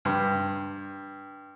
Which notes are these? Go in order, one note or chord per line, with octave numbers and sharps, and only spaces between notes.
G2